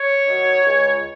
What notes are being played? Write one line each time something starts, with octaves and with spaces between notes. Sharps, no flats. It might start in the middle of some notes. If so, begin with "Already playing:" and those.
Already playing: C#5
D#3 F#3
C#2